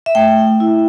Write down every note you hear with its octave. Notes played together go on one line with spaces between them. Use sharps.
E5
A3 G5
E4